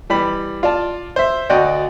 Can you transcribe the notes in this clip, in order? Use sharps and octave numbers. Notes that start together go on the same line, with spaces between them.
E3 G3 B5
F4 D5 A5
C5 E5
D2 F#4 D5 D#5 G5